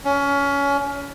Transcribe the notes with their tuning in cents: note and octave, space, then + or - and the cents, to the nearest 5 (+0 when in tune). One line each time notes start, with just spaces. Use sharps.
C#4 +25